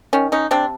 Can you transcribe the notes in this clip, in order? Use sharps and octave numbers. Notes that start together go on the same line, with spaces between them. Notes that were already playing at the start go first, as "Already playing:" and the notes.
D#3 C#4
C#4 D#4
C3 C4 D4